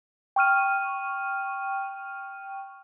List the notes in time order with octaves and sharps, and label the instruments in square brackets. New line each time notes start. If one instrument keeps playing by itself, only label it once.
[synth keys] G5 C#6 F6 D#7